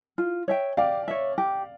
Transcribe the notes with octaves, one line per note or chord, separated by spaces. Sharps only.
F4
C#5 E5 G5
G4 D5 F5
C#5 E5
G4